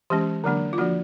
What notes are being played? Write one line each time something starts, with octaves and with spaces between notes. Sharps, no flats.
E3 G#3 C#4 G4
D3 F#3 A#3 D4
F4
F3 A#3 D4 F#4